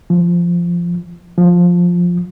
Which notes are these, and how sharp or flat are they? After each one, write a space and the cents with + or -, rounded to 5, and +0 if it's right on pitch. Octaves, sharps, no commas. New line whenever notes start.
F3 -10
F3 +10